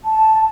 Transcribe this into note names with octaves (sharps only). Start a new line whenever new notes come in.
A5